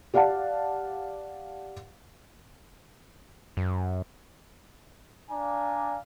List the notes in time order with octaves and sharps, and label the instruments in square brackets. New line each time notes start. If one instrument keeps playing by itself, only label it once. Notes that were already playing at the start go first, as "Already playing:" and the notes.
[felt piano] G4 D5 F5 F#5 A5
[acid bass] F#2
[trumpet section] D4 D5 F5 G#5 A#5